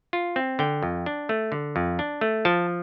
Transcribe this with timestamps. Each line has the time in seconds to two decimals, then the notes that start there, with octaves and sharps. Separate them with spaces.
0.13 F4
0.36 C4
0.59 D3 G5
0.82 F2
1.06 D4
1.29 A3
1.52 D3
1.76 F2
1.99 D4
2.21 A3
2.45 F3 A5